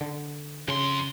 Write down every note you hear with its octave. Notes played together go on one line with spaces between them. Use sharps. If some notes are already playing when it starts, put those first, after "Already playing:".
D3
F2 C#3 C6